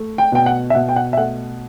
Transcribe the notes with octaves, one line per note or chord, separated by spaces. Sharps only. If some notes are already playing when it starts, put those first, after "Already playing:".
Already playing: A3
G5
B2 G5
F#5
E5
B2 F#5
G5
F#5
E5
A3 F#5